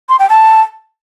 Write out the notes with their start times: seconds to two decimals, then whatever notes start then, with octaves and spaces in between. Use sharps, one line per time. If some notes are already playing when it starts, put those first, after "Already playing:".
0.09 C6
0.19 G5
0.30 A5